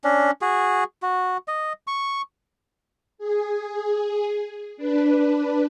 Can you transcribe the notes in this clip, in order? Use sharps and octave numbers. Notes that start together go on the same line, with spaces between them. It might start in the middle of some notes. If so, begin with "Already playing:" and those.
C#4 D4
F#4 G#4
F#4
D#5
C#6
G#4
D4 B4